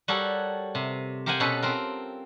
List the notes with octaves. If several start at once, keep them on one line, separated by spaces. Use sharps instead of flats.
G3 F#4 G4 A4 A#4 C#5
C3
G4 A#4 C5 F5 F#5 G#5
B2 C#4 A4 B4
C4 F4 A#4